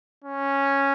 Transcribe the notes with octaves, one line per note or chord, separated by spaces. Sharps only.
C#4